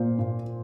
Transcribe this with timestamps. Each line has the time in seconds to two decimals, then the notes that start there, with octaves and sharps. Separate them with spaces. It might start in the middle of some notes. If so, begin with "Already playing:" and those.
Already playing: A#2 A#3 C5
0.19 A#2